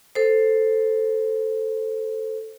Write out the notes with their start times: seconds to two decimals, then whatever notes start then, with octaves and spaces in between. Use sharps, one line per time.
0.15 A4 C5